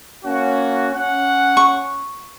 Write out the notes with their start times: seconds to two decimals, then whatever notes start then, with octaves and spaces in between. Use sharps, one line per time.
0.24 A#3 C#4 F#4
0.94 C#4 F#5
1.57 C#6